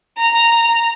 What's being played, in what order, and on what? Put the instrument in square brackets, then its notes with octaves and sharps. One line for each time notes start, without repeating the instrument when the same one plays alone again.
[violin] A#5